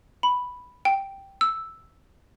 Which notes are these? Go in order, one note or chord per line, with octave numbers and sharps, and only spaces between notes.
B5
G5
E6